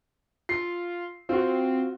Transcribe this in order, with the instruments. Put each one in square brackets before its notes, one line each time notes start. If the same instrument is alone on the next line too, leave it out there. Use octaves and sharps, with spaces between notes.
[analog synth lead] F4 [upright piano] C7
[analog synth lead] C4 [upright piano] F4 F#4